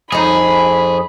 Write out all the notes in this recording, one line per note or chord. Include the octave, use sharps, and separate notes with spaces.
F2 D#4 G#4 B5